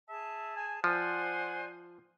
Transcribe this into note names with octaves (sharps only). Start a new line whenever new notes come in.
G#4 E5 A5
G#5
F3 C5 D5 F#5 G#5